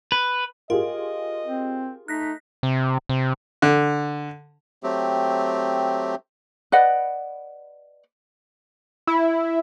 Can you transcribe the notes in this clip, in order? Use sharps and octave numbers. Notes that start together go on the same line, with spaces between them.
B4
F4 G4 G#4 A#4 D#5
C4
A3 D#4 F#6 A#6 B6
C3
C3
D3
F#3 A3 C4 G4
B4 D5 D#5 F#5
E4